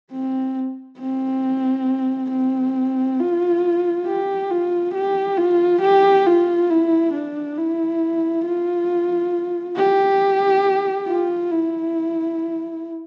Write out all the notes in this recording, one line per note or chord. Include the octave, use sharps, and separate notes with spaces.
C4
C4
C4
F4
G4
F4
G4
F4
G4
F4
E4
D4
E4
F4
G4
F4
E4